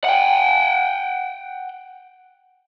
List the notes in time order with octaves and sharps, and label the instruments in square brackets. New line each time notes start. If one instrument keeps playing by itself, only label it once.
[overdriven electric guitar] F#5 G5